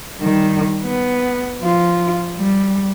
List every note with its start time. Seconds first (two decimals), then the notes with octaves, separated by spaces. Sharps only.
0.19 D#3 G3
0.84 B3
1.60 F3 F4
2.38 G3